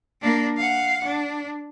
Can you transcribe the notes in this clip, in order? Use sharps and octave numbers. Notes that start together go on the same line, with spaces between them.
A#3 D4
F5 F#5
D4